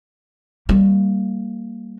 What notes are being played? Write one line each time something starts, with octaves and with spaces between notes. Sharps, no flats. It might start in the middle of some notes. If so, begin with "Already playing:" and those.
G3 A#3